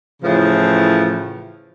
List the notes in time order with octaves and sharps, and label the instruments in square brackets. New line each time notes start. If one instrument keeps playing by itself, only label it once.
[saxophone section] A2 C#3 E3 F3